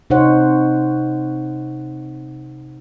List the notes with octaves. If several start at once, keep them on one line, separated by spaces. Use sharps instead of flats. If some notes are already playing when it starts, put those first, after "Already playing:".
C3 D#4 C5 C#5 F#5